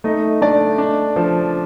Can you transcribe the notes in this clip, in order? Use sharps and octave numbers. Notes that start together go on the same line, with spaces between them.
A3 D#4 D#5
A3 D4 D5
D4
F3